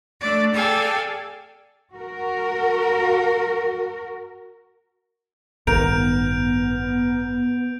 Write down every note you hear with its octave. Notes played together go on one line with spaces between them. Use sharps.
A3 D4 D5
G#4 A4 D5 F5 G5 G#5
F#4 A#4
A1 G2 D#3 B3 A#4 G6 D7 F7